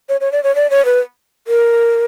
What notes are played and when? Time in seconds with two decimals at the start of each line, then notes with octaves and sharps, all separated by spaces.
0.09 C#5
0.21 C#5
0.32 D5
0.43 C#5
0.55 D5
0.70 C#5
0.85 B4
1.48 A#4